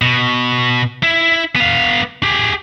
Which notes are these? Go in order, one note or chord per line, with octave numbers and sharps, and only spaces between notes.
B2
E4
B3 F5
G4 G#4